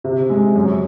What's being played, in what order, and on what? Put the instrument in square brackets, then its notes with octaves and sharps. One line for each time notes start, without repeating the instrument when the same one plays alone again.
[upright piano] C3
G#3
F#2